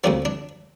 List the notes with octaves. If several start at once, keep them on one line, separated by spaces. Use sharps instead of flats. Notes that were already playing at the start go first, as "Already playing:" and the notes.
D2 C3 F3 D4
D4